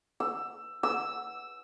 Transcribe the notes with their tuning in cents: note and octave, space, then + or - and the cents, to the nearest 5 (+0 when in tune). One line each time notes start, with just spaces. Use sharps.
E6 +15
E6 -5